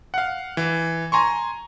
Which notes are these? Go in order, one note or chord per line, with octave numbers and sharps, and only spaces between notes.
F5 F#5
E3
G#5 A#5 C6 C#6